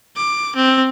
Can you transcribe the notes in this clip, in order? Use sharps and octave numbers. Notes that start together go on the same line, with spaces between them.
D6
C4